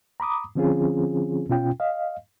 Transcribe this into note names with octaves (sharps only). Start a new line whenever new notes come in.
A#5 B5 D6 D#6
D3 F3 C4 C#4 F4 G#4
B2 C#4 F4 G5
D#5 F5